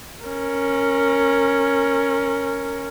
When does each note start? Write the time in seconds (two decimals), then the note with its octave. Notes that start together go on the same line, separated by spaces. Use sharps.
0.25 C#4 A#4